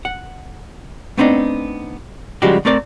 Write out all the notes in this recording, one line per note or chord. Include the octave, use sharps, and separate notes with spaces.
F#5
A3 B3 C4 D4 D#4
C#3 F3 G3 G#3 F#4 G4
A3 C4 A#4 D5